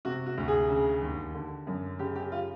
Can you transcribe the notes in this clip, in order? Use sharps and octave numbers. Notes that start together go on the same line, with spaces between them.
C3 F#4
F#4
D2
G#4
C#3
D#2
D3
F#2
C#3 G4
G4
F4